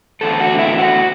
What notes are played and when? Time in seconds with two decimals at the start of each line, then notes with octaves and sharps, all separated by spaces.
0.21 E2 D3 A3 A4
0.40 F#4
0.59 E4
0.78 F#4